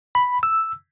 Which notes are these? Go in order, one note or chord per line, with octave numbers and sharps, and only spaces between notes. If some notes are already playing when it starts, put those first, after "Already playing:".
B5
E6